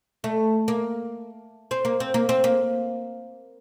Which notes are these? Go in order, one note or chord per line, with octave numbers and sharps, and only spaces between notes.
A3
A#3
C4
A#3
C4
A#3
C4
A#3